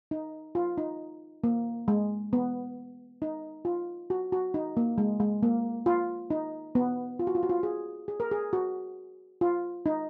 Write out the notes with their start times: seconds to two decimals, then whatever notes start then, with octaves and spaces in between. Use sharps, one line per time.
0.11 D#4
0.55 F4
0.78 D#4
1.44 A#3
1.88 G#3
2.33 B3
3.22 D#4
3.65 F4
4.10 F#4
4.32 F#4
4.54 D#4
4.77 A#3
4.98 G#3
5.20 G#3
5.43 A#3
5.86 F4
6.30 D#4
6.75 B3
7.19 F4
7.27 F#4
7.35 F4
7.43 F#4
7.49 F4
7.63 G#4
8.08 G#4
8.20 A#4
8.31 G#4
8.53 F#4
9.41 F4
9.86 D#4